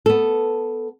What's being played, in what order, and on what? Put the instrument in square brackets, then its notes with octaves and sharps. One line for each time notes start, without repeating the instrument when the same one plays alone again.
[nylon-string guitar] B3 A4